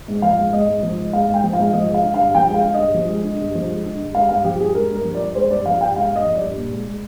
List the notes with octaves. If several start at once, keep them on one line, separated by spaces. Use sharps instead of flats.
G#2
F3 F5
G#2
G#3 D#5
G#2
F3
G#2
G#3 F5
G#2
G5
F3
F5
G#2
F3 D#5
G#3
F5
D3
G2 F5
F3 G5
G#3 F5
D3
D#5
G2
F3
G#3
D3
G2
F3
G#3
D3
G2
G#3 F5
G2 F5
F3 G4
G2 G#4
G#3 A#4
G2
A#4
F3
D5
G2
G#3 C5
G2 D5
F3 F5
G2 G5
G#3 F5
G2
D#5
F3
D5
G2
A#2
G#3
G#3